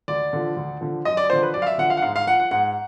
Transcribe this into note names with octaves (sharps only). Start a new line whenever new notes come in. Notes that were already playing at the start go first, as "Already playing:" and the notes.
D2 D5
D3 F3
D2
D3 F3
F#2 D#5
D5
D3 F3 C5
B4
F#2 D5
F5
E5
D3 F3 F#5
F5
F#5
G#2 F5
F5
F3 F#5
F#5
G#2 F#5